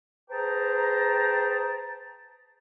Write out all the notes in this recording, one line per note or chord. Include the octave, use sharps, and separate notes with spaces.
G#4 B4 C5 G5 A5 A#5